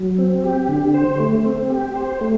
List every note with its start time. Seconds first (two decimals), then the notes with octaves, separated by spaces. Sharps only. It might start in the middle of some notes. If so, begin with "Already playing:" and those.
Already playing: F#3
0.18 C4
0.44 G4
0.69 D3
0.94 C5
1.20 A3
1.45 C4
1.70 G4
1.95 C5
2.21 A3